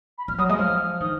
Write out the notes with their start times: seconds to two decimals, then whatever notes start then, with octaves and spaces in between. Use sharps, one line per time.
0.18 B5
0.28 F3 F6
0.38 F#3 D#6
0.49 G#3 D#6
0.59 F3 F6
1.00 D#3 D#6